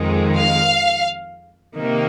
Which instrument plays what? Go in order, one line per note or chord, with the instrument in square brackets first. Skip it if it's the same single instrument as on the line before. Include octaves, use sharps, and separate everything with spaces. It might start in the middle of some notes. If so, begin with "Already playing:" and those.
Already playing: [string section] F2 D#3 G#3
F5
C3 D#3 A#3